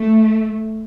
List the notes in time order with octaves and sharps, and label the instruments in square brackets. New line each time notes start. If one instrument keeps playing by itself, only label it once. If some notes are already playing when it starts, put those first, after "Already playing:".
Already playing: [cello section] A3